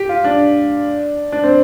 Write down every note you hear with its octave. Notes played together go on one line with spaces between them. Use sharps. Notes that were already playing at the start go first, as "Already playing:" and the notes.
Already playing: G4
F4
D4
D4
C4